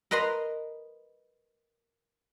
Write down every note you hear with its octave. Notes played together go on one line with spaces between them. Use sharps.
A#4 B4 D#5 A#5 C6